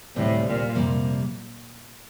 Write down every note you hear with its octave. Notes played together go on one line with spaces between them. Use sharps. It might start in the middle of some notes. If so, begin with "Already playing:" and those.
D2 A2 C3 G3 C4 F4
A#2
F2 C3 G3 A#3